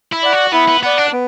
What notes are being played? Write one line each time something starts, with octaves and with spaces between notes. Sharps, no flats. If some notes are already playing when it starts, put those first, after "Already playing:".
E4
D5 F#5
F#4
B3 E4
B3
B3 D5 F#5
D4
B3